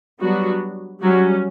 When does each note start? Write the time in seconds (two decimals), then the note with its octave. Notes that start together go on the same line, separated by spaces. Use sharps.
0.20 F#3 G3 B3 D4 F#4
1.02 F#3 G3 C#4 F#4